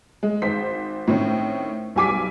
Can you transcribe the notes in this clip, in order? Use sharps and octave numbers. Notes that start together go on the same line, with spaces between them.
G#3
G#1 C5 B6
A2 D#3 C4 C#4
B1 G3 G#5 D6 B6